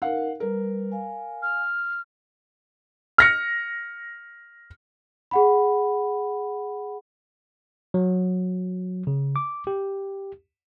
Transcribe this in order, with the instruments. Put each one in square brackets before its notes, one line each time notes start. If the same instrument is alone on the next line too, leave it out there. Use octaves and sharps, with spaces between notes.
[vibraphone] D#4 A#4 [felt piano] F5 F#5
[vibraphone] G3 B4 [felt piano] A#4
[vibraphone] F5 G#5
[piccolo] F6
[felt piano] F6 A#6 C#7
[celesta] G#4 F#5 B5
[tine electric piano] F#3
C#3
D6
G4